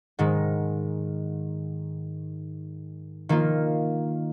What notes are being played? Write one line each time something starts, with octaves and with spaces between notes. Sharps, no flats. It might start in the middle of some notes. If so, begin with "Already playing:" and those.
G#2 D#3 G#3
D#3 A#3 F4